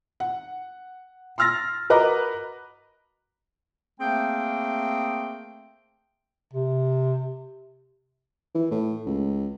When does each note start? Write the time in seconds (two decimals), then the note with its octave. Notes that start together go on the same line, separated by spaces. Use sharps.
0.20 F#5
1.38 C6 E6 F6 A6 A#6
1.90 F#4 A#4 B4 D#5 A#5 D6
4.00 A3 A#3 C4 G#4 G5
6.53 C3
8.55 E3
8.71 A2
9.06 C#2